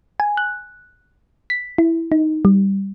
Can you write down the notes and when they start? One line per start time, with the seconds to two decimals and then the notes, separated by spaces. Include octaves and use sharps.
0.20 G#5
0.37 F#6
1.50 B6
1.78 E4
2.12 D#4
2.45 G3